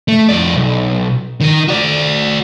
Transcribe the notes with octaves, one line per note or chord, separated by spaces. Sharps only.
A3
F2 D5
B1
D#3 A#4
F#4 D5